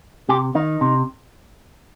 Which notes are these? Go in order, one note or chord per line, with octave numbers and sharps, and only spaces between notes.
C3 G4
D#3 D#4
C3